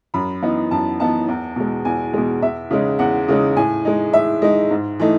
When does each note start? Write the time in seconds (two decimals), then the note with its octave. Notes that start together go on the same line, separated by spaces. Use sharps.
0.14 F#2 B5
0.42 E3 B3 D#4
0.71 F#2 A5
1.00 E3 B3 D#4 A5
1.28 E2
1.56 B2 G#3
1.85 E2 G#5
2.13 B2 G#3
2.42 E2 E5
2.71 C#3 G#3 D#4
2.99 E2 F#5
3.28 C#3 G#3 D#4
3.56 A2 G#5
3.85 G#3 D#4
4.13 A2 E5
4.42 G#3 D#4 D#5
4.71 G#2
5.00 E3 A3 D#4